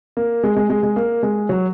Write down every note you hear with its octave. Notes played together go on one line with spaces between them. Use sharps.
A#3
G#3
G#3
G#3
G#3
A#3
G#3
F#3